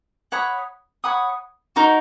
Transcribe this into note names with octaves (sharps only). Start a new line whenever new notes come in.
C#5 F#5 B5 D#6
C#5 F#5 B5 D#6
D#4 F#4 A#4